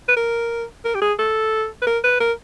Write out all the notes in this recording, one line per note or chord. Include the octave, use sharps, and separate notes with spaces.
B4
A#4
A#4
G4
G#4
A4
B4
A#4
B4
A#4